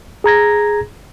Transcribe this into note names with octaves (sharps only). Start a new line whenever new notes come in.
G#4 A#5 G#6 A#6